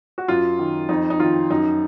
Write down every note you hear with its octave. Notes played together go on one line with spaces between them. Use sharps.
F#4
F#2 F4
D#3
F2 D#4
D#4
D#3 F4
F#2 D#4